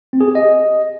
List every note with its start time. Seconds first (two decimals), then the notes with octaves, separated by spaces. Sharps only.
0.13 C4
0.21 G#4
0.28 G4
0.35 D#5